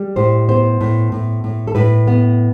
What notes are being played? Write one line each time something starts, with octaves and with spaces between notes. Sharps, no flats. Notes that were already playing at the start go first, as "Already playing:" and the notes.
Already playing: G3
A2 C5
B3 C5
A2
A2
A2
A4
A2 B4
B3